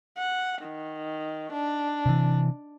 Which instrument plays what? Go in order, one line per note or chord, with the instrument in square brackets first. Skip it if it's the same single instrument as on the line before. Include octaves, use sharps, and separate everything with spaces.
[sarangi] F#5
D#3
D4
[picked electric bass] C3 E3